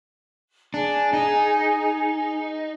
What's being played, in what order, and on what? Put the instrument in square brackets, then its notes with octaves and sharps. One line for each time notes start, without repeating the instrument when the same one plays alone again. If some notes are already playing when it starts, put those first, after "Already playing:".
[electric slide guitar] D4 [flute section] G#4 G#5
[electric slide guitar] D#4